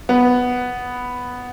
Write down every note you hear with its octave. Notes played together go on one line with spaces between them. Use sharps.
B3